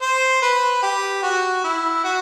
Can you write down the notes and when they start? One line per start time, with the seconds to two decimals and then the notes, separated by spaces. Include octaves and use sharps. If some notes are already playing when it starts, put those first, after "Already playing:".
0.02 C5
0.42 B4
0.82 G4
1.23 F#4
1.64 E4
2.04 F#4